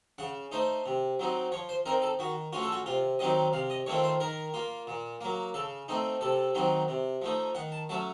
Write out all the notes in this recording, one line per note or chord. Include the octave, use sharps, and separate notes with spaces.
C#3 F#5
A3 D#4 C5
C3
F#3 C4 D#4
F3 C#5
C5
C4 D#4 A#4
A4
D#3 F#4
A3 C#4 F4 F#4
A4
F#4
C3 F4
D#3 F#3 C4 D#4 D#5
C3 F5
D#5
D#3 A3 C4 F4 C#5
C5
D#3 A#4
A#3 F4
A#2
F#3 A#3
C#3 A4
A3 C4 D#4
C3 A4
D#3 F#3 C4 D#4
C3
F3 A3 D#4
D#3 F#5
A5
F#3 A3 C#4 A5